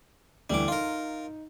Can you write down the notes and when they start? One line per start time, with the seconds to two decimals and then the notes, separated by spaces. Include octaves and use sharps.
0.50 D2 E3 G3 D6
0.68 D#4 F4 A#4